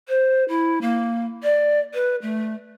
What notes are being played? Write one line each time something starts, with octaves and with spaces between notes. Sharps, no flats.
C5
E4
A#3
D5
B4
A3